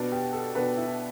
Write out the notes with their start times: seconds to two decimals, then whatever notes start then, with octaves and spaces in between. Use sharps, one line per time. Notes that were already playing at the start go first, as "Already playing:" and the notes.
Already playing: B2 B3 D4
0.12 G4
0.33 A4
0.55 B2 B3 D4 B4
0.77 E4